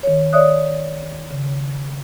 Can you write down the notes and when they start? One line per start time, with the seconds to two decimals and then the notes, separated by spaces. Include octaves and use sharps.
0.03 D#3 C#5
0.32 C#5 D5 E5 D#6 F#6
1.31 C#3